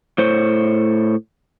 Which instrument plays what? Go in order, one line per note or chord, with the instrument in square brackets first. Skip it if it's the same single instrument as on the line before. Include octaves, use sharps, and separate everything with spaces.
[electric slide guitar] A2 C5 C#5